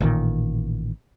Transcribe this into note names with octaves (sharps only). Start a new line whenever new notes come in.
A1 A#2 D#3